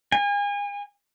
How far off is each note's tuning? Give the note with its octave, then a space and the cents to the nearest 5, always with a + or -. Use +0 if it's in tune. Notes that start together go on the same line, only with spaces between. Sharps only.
G#5 -35